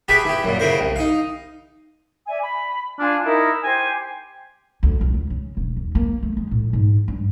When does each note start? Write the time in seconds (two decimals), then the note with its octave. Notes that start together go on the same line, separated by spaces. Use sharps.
0.08 G4 G#4 B4 E5 G#5 A5
0.25 E4 G4
0.43 F#2 A#2
0.59 C#3 E4 A#4 C5
0.79 C2
0.96 D#4 F5
2.27 D5 E5 G#5
2.42 B5
2.99 D4 F4 G#5 F6
3.25 D#4 E4 A#4
3.63 G4 C5 G#5
4.83 D2
5.01 C#2
5.14 C#2
5.30 C#3
5.57 E1
5.76 D#2
5.95 A#3
6.23 A3
6.37 G#3
6.51 A2
6.73 G#2
7.08 G2